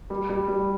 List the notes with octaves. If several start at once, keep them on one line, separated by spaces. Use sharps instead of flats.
G3
G3
G3